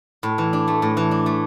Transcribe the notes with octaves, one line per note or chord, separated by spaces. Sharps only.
A2
E3
D4
A3
A2
E3
D4
A3